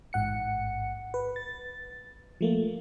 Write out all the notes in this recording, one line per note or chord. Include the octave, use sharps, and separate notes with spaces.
A1 G#2 F#5 C#7
B4
A6
F3 A3 A#3